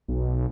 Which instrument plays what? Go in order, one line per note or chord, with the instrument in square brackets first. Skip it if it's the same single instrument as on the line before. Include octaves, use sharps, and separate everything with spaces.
[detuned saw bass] B1